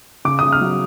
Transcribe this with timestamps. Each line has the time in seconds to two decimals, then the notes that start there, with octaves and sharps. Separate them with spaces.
0.25 C#3 D6
0.39 C#3 D#6
0.52 F6
0.61 F#3